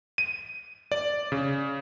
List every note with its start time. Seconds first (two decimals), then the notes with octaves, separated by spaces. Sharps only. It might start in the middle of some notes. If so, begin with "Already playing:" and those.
0.18 D#7
0.92 D5
1.32 C#3